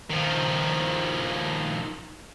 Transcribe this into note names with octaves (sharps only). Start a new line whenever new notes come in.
D#3 F3